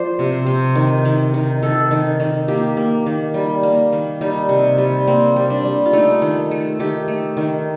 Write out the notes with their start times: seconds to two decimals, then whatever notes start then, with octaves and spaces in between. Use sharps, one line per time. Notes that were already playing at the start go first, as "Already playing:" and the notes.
Already playing: F3 C5 D5
0.19 C3
0.32 C5
0.47 C3
0.75 D#3
1.05 D#3
1.34 D#3
1.63 D#3 A4
1.91 D#3
2.20 D#3
2.48 A#3 G4
2.77 A#3
3.06 D#3
3.34 G3
3.63 A#3
3.93 D#3
4.21 G3 D#4
4.49 C3
4.78 G3
5.08 A#3 C4
5.36 G3
5.50 D4
5.65 G3
5.85 F4
5.93 A3 D#4
6.22 D#3
6.51 A3
6.80 D#3 G4
7.08 A3
7.37 D#3